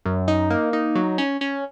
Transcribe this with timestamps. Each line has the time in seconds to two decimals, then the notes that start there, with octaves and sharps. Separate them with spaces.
0.05 F#2
0.28 D#4
0.50 A#3
0.73 D#4
0.95 F#3
1.18 C#4
1.41 C#4